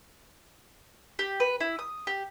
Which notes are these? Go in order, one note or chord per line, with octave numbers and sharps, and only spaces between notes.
G4
B4
E4
D#6
G4